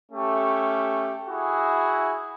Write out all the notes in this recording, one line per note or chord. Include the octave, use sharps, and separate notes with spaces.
A3 C#4 G4
E4 F#4 G#4